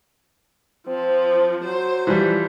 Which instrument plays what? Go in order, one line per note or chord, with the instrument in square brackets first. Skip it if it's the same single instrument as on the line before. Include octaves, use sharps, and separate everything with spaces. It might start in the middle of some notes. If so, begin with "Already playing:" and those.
[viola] F3 [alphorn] C4
[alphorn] F#3 [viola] C5
[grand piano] E3 F3 G3